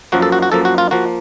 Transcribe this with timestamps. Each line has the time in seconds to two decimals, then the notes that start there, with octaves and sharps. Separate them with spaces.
0.12 F#2 F3 A#3 F#4
0.22 A4
0.32 F#4
0.42 F#4
0.52 F#2 F3 A#3 A4
0.65 F#4
0.78 F4
0.91 F3 A#3 F#4